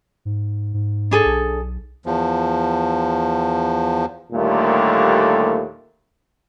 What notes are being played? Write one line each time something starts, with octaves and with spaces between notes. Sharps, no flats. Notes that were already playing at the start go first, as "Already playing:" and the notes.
G#2
G#2
D4 G#4 A4
B1
E2 F3
D#2 A#2 D3 G3 A3